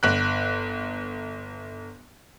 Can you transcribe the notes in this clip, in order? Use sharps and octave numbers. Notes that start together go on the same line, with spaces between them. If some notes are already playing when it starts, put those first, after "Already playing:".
G1 F#6